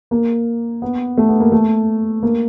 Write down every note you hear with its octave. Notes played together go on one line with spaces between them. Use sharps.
A#3
B3
A3
B3
A#3
A3
A#3